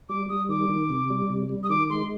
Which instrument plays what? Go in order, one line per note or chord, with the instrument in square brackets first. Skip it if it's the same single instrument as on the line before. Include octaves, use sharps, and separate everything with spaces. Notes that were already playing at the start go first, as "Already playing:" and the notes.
[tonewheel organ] G3 [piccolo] D6
[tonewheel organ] G3 [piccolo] D#6
[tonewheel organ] D#3 [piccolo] D6
[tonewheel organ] D#3
C3
G3
C3
G3
[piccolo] D#6
[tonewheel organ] D#3 [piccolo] D6
[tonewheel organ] G#3 [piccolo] C6